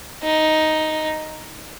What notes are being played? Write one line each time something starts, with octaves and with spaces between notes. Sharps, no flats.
D#4